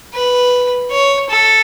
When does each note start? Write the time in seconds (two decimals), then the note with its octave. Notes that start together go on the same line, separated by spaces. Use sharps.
0.14 B4
0.91 C#5
1.30 A4